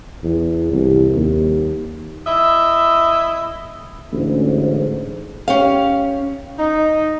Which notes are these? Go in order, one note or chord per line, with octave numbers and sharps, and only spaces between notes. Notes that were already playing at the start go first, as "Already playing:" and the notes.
E2
C2
D#2
E4 D#5 E5
A1 D2 G#2
C#4 G4 F5
D#4